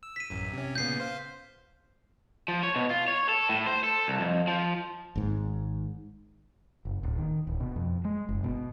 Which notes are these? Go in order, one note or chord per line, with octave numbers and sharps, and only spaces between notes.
E6
B6 D#7
A1 F#2
C3 C#4
A#2 C#3 B3 G6 C7
C5 F5
F3
C#5
B2
F4
C#5
A4
A2
C5
A4
C2
F2
F3
G#1 G#2
F#1
D1
D#3
D1
B2
F2
G#3
F#1
B2